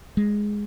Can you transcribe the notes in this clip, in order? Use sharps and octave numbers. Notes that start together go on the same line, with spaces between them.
G#3